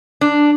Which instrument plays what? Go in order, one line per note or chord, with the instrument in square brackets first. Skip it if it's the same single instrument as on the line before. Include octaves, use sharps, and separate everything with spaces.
[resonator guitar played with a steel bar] D4